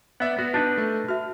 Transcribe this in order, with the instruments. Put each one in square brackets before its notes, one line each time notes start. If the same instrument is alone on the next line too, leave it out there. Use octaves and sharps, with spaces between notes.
[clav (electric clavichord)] B3 [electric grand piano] D5 E5 F#5
[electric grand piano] B3 [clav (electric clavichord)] F#4
[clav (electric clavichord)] D4 D#4 B4 [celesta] A5
[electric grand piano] A3
[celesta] F#4 E5 [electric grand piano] F6